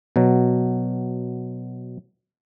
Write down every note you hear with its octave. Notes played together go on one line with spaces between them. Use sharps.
B2 F#3